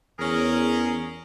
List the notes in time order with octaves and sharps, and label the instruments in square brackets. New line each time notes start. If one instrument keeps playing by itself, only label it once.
[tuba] E2 [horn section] C#4 G#4 A#4